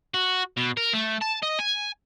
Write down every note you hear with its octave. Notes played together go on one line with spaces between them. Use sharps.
F#4
B2
A#4
A3
A5
D#5
G#5